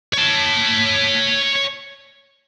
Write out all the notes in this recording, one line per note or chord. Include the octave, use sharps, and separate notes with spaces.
C#5 A5